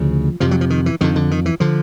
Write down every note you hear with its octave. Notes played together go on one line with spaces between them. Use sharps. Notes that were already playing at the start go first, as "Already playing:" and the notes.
Already playing: D2 C#3 F3
F2 C3 F3
F#3
F3
D#3
E3
F2 D3 D#3
D3
D#3
E3
D3 F3